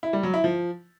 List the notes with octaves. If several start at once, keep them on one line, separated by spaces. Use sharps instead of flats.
E4
G3
F#3
E4
F3